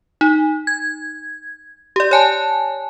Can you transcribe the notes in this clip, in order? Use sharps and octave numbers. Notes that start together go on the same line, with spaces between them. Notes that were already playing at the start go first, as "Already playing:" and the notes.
D#4
G#6
G4 D5
C#5 G#5 A5